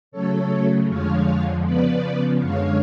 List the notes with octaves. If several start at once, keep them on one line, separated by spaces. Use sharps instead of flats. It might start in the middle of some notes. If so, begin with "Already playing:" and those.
C#3 F#3 A3 A4 C#5
F2 D3 F3 G#3 C#5 F5
C#3 F3 B3 B4 D5
F#2 D3 G#3 C#5 F5